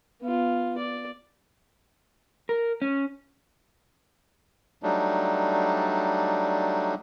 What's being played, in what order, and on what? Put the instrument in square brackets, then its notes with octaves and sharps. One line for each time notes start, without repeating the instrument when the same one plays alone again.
[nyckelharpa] B3 F4
D5
[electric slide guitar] A#4
C#4
[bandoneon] F#3 G3 A3 D4 D#4